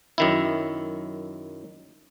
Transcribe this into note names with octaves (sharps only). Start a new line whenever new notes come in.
F#2 D#3 E4